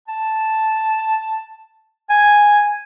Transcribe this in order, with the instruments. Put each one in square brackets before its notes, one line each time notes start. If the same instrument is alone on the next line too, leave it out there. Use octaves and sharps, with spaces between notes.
[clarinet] A5
G#5